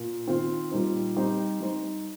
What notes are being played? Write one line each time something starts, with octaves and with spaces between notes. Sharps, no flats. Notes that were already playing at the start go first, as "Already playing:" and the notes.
Already playing: A#2 A#3
D#3 C4 F4 C5
A#2 G3 D#4 C5
G3 C4 D#4 G4 C5
G3 D#4 C5